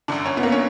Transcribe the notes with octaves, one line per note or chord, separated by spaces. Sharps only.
G1 F#2 D3 D4
C#4
B3
A#3
C#4